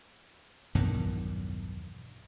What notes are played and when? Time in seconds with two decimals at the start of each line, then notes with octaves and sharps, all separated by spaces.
0.75 B1 E2 G2 D#3